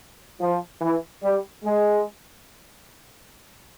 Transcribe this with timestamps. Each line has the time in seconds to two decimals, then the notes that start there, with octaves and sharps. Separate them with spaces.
0.40 F3
0.81 E3
1.22 G3
1.63 G#3